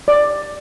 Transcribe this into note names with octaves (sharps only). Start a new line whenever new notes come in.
D5